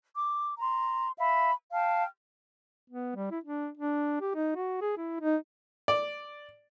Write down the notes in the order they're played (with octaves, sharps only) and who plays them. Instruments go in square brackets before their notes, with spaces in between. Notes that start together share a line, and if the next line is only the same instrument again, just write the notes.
[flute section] D6
A#5 C6
E5 F5 B5
F5 G5 A5 F6
[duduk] B3
G3
E4
D4
D4
G4
D#4
F#4
G#4
E4
D#4
[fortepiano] D5